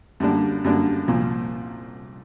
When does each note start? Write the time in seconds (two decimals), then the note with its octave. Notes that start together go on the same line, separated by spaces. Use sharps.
0.20 F#2 D3 G3 A#3 D4
0.64 F#2 D3 G3 A#3 D4
1.08 C2 A#2 F3